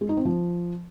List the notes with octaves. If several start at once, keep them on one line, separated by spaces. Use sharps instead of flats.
G#3
D#4
C4
F3